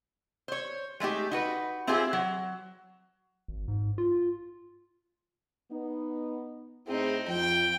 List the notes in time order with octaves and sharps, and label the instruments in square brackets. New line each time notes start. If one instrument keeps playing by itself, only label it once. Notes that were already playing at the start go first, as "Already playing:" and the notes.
[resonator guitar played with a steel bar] C5 C#5
G#3 A3 D#4 G4
D#4 F#4 B4
C4 E4 F4 G4 G#4
F#3
[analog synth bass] G#1
G#2
F4
[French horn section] B3 D#4
[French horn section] A2 E4 G#4 [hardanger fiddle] C4 D#4
[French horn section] F2 F3 [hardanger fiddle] G5